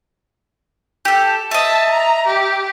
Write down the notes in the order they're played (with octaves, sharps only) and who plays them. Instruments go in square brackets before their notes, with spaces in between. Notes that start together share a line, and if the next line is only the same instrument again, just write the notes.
[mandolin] G4 A4
[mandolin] D#5 E5 [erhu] A5
[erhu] A#5
G4